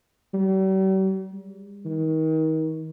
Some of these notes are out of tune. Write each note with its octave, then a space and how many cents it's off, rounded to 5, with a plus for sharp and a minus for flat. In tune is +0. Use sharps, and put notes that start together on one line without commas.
G3 -45
G3 +45
D#3 +30